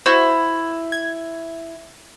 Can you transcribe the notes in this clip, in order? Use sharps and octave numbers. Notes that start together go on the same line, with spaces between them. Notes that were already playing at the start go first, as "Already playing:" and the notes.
E4 F#4 C5
G#6